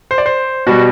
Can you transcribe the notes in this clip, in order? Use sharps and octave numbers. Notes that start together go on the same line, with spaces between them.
C5
D5
C5
B2 G3 F#4